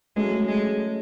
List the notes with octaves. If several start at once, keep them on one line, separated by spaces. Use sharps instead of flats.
F#3 G#3 A3 C#4
G#3